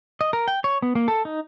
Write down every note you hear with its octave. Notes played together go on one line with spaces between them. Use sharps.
D#5
A#4
G5
C#5
B3
A#3
A4
D#4